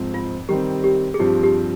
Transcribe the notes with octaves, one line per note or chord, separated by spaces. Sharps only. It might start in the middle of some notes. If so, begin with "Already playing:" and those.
Already playing: G#2 F3 C4
F4
D#3 G3 C4 G4
G4
G#4
G2 F3 C4 G4
G4